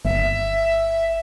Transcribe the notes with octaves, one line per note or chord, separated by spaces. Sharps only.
G1 E5